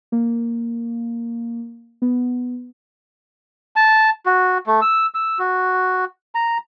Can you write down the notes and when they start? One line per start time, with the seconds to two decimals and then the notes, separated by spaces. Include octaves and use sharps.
0.12 A#3
2.02 B3
3.76 A5
4.26 F#4
4.66 A3
4.82 E6
5.14 E6
5.39 F#4
6.35 A#5